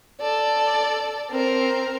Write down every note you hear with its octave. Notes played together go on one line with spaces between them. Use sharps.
A4 D5
C4 A#4